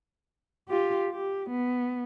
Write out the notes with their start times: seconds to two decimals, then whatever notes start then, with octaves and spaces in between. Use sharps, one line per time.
0.69 F4 G4
1.10 G4
1.50 B3